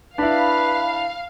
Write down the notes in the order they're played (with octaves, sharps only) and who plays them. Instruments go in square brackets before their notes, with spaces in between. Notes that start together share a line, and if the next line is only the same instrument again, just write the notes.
[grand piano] D4 E4 [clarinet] B4 [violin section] F5 [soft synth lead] B5